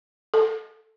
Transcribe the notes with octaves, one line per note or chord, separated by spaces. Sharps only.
A4